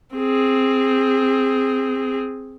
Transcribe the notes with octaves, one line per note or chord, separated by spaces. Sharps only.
C4 G#4